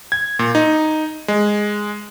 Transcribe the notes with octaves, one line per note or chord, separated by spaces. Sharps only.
G#6
A#2
D#4
G#3